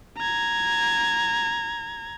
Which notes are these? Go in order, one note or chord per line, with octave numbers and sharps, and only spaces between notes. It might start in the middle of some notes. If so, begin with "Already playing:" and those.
A#5 G#6